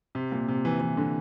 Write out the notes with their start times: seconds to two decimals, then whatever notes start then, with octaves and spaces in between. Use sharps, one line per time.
0.15 C3
0.32 A#2
0.48 C3
0.65 E3
0.80 E3
0.97 D3